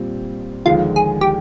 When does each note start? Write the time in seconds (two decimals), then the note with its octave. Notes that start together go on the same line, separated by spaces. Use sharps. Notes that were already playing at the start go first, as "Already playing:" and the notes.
Already playing: A#2 G3 C4 F4
0.66 D#2 D3 F3 G#3 F4
0.96 G#4
1.21 G4